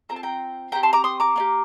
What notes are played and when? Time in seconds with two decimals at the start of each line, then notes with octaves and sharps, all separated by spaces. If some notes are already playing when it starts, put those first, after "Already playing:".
0.09 C4 F4 A4 A#5
0.16 A5
0.23 G5 A#5
0.72 C4 G4 G5 A#5
0.83 A5 C6
0.93 A#5 D6
1.04 C6 D#6
1.20 A#5 D6
1.36 A#3 D4 G4